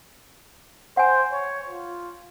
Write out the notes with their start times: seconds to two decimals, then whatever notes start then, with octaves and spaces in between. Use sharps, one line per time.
0.97 C5 F#5 G#5
1.32 C#5
1.69 F4